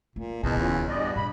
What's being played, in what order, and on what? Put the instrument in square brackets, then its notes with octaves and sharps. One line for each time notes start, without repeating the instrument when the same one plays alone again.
[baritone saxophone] A#2 [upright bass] A3
[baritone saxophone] E2 [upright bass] A#2 C#3 [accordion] D#5 A5
[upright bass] D1 D#3 [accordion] C#4 F4
[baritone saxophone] G2 [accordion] B3 D5 D#5 [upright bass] D4
[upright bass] A#2 [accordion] B5